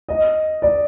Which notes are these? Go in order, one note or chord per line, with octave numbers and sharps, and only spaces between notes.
D#5
D5